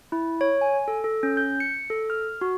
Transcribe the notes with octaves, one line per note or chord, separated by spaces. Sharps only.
E4
C#5
G#5
A4
A4
C#4
G6
C#7
A4
F6
F#4